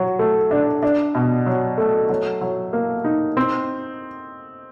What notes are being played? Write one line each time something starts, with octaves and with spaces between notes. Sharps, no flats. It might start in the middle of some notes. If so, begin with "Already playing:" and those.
Already playing: F#3 F#4
A3
D4
D4
B2
F#3
A3
F#3
F#3
A#3
D#4
C4